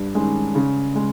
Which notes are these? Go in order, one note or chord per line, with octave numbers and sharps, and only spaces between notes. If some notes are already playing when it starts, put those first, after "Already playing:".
Already playing: G2
D#3 G#3 C#4
C#3
G#3